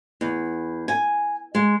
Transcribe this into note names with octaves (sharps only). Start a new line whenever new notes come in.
E2
G#5
G#3